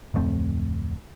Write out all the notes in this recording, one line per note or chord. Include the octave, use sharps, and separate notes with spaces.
D1 F2 A3 C4